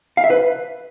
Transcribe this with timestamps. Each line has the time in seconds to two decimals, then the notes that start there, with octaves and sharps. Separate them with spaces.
0.17 F5
0.24 E5
0.30 B4